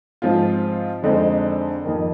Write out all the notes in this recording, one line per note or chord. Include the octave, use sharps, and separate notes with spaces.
G#2 F3 C4 F4
F2 D3 G#3 C4 D#4
F2 D#3 A#3